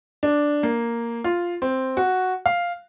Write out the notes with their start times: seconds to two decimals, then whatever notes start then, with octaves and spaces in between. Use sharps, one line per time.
0.23 D4
0.63 A#3
1.24 F4
1.62 C4
1.97 F#4
2.46 F5